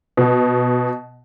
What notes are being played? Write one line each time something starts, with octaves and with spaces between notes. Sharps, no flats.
B2